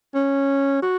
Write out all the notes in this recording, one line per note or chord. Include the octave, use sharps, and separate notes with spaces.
C#4
F#4